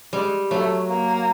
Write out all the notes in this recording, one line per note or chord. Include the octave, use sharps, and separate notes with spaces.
G3 G#3
F#3 A3
A#3